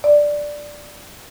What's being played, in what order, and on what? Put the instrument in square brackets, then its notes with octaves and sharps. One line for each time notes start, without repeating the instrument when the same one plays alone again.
[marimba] D5